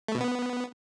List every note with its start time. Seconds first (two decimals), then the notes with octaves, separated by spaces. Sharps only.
0.08 A3
0.15 B2
0.21 B3